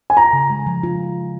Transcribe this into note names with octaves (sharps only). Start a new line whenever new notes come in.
G#5
F4 A#5
C#3
G#3
F3
F4